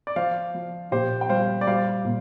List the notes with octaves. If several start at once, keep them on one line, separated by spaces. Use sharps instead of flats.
D5
F3 C5 F5
F3
A#2 G4 C5
G5
G3 C5 F5
D5
G3 C5 F5
A#2